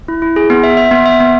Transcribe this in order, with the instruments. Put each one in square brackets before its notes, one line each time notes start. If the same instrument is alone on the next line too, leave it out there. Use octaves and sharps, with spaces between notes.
[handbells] E4
E4
G#4
B3
E5
E5
B3
E5
B3